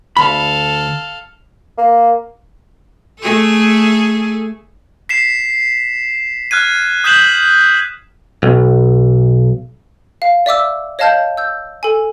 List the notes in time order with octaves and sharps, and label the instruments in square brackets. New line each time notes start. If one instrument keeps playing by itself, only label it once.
[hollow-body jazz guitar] D2 B5 [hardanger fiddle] A4 F5
[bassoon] A#3
[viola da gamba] A3 G#4 A4
[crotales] B6 C7 E7
F6 F#6 G#6 D#7
D#6 F#6 G6 B6 E7 F#7
[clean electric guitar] B1
[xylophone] F5
D5 E5 D6 E6
C#5 D#5 F5 A5 F6 G6
E6 G6
A4 G#5